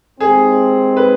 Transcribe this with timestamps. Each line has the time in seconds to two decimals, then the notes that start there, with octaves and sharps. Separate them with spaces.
0.20 D#2 D#3 G#3 C4 G#4
0.97 B4